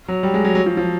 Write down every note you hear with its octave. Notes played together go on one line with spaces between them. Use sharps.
F#3
G3
G#3
F#3
F#3
F3
F3